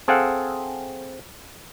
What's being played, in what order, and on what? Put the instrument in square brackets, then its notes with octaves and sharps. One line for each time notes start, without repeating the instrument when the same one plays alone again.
[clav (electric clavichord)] C4 G#4 A4 F5 F#5